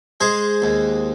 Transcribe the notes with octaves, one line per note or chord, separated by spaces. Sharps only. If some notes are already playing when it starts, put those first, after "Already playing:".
G#3 G#4 C5
D#2